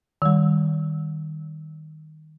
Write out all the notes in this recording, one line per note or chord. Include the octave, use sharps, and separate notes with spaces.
D#3 G3